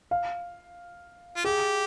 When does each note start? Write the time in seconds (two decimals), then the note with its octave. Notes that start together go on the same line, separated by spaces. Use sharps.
0.11 F5
1.36 F4
1.44 G4 G#4